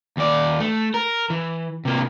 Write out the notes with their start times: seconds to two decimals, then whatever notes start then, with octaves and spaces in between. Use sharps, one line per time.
0.17 D#2 D5
0.60 A3
0.94 A#4
1.30 E3
1.85 C3 A#3